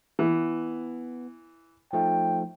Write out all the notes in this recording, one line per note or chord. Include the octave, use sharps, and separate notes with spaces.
E3 B3
F3 A3 D#4 G5